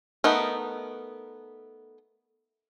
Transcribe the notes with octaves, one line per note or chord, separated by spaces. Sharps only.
A3 B3 D#4 A#4